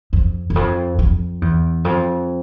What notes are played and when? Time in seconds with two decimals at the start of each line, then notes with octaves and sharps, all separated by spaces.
0.13 F2
0.50 E2
0.56 F2
0.99 F2
1.42 E2
1.85 F2